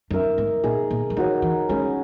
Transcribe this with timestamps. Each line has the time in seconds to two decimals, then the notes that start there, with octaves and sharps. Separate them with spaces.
0.11 F#2 D#4 A#4 E5
0.38 G#2
0.64 A#2 D#4 G#4 D#5
0.91 A#2
1.10 F#3
1.17 E3 D#4 F#4 C#5
1.42 E3
1.69 G#3 C#4 G#4 B4